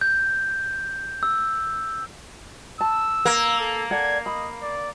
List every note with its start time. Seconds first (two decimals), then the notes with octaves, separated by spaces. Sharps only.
0.01 G6
1.23 E6
2.81 A5 E6
3.25 A#3
3.60 A4
3.91 A4 D5 F#5 G#6
4.26 D#5 B5
4.62 D5